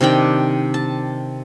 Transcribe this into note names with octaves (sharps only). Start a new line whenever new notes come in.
C3 D#3 D4 G5
A5